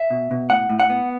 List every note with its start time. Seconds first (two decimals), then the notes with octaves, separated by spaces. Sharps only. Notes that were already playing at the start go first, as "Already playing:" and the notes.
Already playing: E5
0.10 B2
0.31 B2
0.50 A2 F#5
0.70 A2
0.80 F#5
0.90 B3